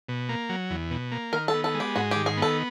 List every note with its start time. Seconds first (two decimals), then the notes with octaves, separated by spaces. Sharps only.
0.09 B2
0.29 A#3
0.49 F#3
0.70 E2
0.91 B2
1.12 A#3
1.33 D#3 A#4
1.48 A4
1.54 B3
1.64 A4
1.74 G#3
1.80 G4
1.96 G#2 F#4
2.11 D#3 G4
2.26 G#4
2.37 B3
2.42 A4